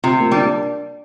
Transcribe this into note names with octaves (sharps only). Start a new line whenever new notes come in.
C3 F4
A#3
G3 D4